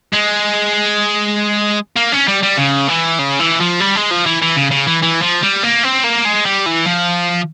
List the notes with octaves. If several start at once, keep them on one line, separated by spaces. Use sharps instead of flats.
G#3
A#3
C#4
G3
G3
C#3
E3
C#3
E3
F3
G3
G#3
F3
E3
E3
C#3
C#3
E3
E3
F3
G3
A#3
C4
A#3
G#3
G3
E3
F3